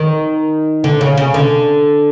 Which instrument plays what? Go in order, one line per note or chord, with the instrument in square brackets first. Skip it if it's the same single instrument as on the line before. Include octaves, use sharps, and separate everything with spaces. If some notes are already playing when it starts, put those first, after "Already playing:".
Already playing: [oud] D#3
D3
C#3
C#3
D3